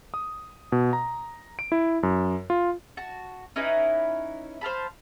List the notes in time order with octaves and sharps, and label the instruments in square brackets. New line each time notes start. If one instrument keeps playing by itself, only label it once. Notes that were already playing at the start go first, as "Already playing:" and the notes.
[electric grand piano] D#6
B2
A#5
D7
E4
F#2
F4
[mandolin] F#4 A5
C#4 D#4 E4 B4
C5 F5 A5 B5